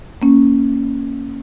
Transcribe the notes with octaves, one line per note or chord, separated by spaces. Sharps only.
A#3 C#4